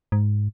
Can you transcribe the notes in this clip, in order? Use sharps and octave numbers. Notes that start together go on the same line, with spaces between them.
G#2